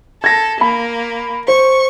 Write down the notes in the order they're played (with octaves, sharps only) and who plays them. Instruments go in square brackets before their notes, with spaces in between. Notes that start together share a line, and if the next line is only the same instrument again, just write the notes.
[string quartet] A4 [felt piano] G#6 A#6
[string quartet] A#3 [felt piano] B5
[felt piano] C5 [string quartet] C#6